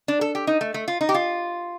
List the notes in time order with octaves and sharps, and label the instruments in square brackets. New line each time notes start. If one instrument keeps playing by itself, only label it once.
[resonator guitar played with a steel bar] D4
A4
G4
D#4
A3
A3
F4
D#4
G4
F4